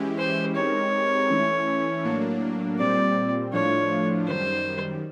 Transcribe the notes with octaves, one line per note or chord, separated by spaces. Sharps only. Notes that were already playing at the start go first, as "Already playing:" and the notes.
Already playing: E3 G#3 C#4 E4 G4
C5
G#3 C4 D#4 G4 A#4 C#5
E3 A3 C#4 E4
A2 F#3 A#3 D4
A#2 G3 C4 D5
A2 F3 A3 D4 F4 C#5
F#2 D#3 G3 C5